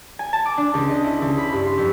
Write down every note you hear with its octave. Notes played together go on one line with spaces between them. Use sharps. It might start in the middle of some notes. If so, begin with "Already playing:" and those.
G#5
A5
D6
D4
C#2
D#5
E4
C#2
B5
G2
C6
F2